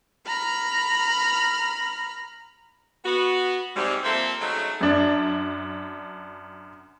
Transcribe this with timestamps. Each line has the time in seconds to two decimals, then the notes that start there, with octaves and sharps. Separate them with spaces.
0.25 A#5 B5 F6
3.05 B3 F#4
3.76 G#2 C3 G3
4.03 F3 A#3 C4 A4 C5 E5
4.40 C#3 F#3 G#3 A3 D#4
4.81 F#2 D4